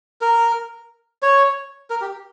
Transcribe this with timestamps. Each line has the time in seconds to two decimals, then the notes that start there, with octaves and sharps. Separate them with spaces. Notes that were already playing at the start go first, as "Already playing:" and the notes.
0.21 A#4
1.23 C#5
1.90 A#4
2.01 G4